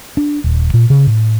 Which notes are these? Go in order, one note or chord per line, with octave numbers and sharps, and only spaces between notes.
D4
D#1
A#2
C#3
A2